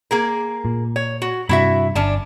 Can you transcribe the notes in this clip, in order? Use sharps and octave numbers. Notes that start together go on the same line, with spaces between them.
A#3 G#4 A#4
A#2
C#5
F#4
G2 C3 E4 F#4 E5
G1 C#4 D4 A5